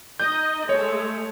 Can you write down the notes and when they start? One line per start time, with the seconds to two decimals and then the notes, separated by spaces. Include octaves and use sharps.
0.20 D#4 D#5 G6
0.69 G#3 A3 C#5